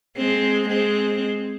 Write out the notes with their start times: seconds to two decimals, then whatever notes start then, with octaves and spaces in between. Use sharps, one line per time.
0.17 G#3 C4
0.69 G#3 C4